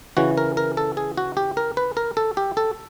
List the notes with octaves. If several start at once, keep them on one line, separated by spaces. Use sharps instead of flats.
C#3 E3 F#4
A#4
A#4
A4
G#4
F#4
G4
A#4
B4
A#4
A4
G4
A4